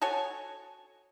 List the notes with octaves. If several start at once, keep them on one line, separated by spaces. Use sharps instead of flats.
F#4 A4 C#5 G#5